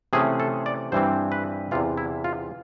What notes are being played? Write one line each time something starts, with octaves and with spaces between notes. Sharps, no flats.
C3 E3 A3 C#4 G#4
A4
D5
G2 E3 G3 C4 C5
B4
E2 C3 E3 F4
E4
F4